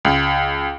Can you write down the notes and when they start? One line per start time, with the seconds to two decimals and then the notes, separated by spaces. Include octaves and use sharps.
0.05 C#2